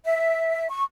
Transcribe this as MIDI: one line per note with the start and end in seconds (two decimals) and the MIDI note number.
0.04 0.69 76
0.70 0.82 85